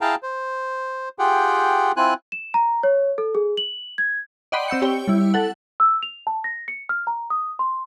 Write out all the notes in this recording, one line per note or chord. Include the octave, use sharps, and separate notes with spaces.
E4 G#4 F5 G5 A5 A#5
C5
F4 G4 G#4 F#5 G5
C4 E4 F4 G#5 F#6
E7
A#5
C#5
A4
G#4
F#7
G#6
D5 D#5 F#5 G5 B5 C6
C4 E6 G6 C#7
G4 C#5 G5
G3 E4
A4 F#5
E6
F7
A5
A#6
C#7
F6
A#5
D#6
C6